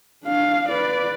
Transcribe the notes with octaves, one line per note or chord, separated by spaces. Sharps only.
D4 F5
B4 D5